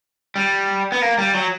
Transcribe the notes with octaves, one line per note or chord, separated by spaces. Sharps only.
G3
B3
A#3
G3
F#3